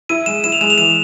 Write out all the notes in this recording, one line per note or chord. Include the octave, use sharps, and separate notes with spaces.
E4 D#7
G#3 E7
E4 E7
F7
G#3 E7
F7
E3 E7